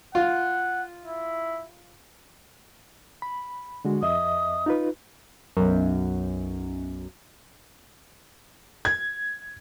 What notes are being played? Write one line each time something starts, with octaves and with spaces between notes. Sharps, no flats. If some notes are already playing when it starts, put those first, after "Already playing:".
F4 F#5
E4
B5
D3 G#3 F#4
F2 D#5 E5 D#6
D#4 F4 B4
B1 F#2
G#6